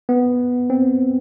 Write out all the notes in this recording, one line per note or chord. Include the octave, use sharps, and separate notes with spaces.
B3
C4